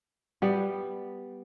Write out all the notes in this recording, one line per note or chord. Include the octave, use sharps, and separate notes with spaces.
G3 B3